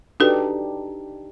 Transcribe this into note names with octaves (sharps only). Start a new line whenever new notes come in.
D4 D#4 F#4 G4 A4 B4